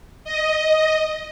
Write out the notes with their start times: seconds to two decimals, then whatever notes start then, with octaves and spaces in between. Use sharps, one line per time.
0.24 D#5